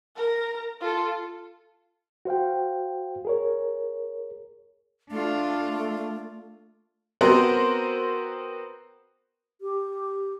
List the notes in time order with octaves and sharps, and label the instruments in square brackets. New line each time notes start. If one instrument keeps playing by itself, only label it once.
[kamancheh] A#4 A#5
F4 A4
[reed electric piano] F#4 C5 F5 G5
G#4 A#4 C#5
[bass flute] A3 [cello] D4 F4
[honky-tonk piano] B3 C4 F#4 A#4 C5
[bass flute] G4